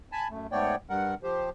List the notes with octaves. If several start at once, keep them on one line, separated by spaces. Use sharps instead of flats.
G#5 A5 B5
F#2 A3
G#2 A3 B3 C#5 D5 G5
G2 G3 A#4 F#5
F3 G4 C5